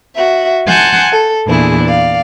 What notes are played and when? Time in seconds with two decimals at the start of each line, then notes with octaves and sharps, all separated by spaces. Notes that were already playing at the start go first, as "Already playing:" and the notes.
0.15 F#4 E5
0.67 F#5 G#5 A5 C6 G6
1.12 A4
1.46 E2 A#2 D4 E4 G#4
1.84 D5 F5